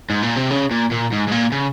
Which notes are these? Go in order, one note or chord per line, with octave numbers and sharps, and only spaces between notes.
G#2
A#2
C3
C#3
A#2
A#2
G#2
G#2
A#2
C#3